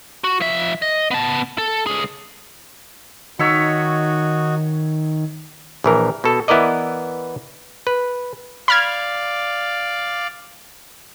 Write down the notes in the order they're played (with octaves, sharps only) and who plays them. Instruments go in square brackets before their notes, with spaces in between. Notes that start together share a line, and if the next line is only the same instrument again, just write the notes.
[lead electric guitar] F#4
F3 E5
D#5
B3 A5
A4
C#2 G#4
[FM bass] D#3 [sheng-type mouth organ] D#4 F#4 [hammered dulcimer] C#5 E5 C#6
[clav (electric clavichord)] A#1 E3 A#4
B2 A4
E3 B3 E4 A#4 D5 D#5
B4
[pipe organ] D5 F5 [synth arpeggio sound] B5 F6 G#6